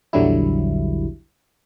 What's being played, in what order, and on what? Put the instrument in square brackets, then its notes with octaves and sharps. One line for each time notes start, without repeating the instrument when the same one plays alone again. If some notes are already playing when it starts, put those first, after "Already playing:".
[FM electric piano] A#1 E2 D3 F#3 G3 E4